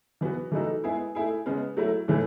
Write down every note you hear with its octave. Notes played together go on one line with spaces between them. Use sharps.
E3 B3 F#4
E3 A3 D#4 F#4 A4
G#3 B3 E4 G#4
A3 E4 G#4
C#3 G#3 B3
F#3 A3 E4
A2 E3 A3